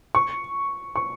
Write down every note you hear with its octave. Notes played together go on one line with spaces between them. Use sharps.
C#6
C#6